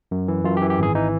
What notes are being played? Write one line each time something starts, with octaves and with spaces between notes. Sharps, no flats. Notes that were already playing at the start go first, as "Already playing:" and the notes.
F#2
E3
F#2 F4
G4
E3
G4
G#1 G#4
E3 D#4